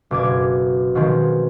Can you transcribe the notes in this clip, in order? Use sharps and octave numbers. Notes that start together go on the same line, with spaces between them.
F#1 B2 D6 G#6
B2 D#3 F3 G#3 C4